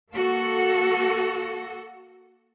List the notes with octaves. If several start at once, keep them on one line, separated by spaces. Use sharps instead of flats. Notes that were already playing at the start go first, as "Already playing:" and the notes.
A#3 F#4 A4